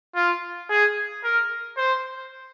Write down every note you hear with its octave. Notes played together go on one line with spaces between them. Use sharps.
F4
G#4
A#4
C5